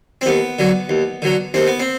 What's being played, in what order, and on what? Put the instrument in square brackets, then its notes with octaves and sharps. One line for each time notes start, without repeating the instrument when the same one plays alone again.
[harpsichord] C4
D#2 B3
D3 F#3
D#2
D3 F#3
D#2 C4
B3
C4